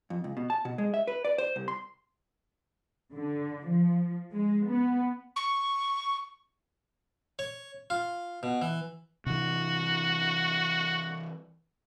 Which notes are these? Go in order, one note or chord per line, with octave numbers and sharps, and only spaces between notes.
F2
C#2
B2
A5
B2
G#3
E5
B4
D5
C5
C2
C6
D3
F3
G#3
B3
C#6
C#5
F4
B2
E3
C3 E3 F#4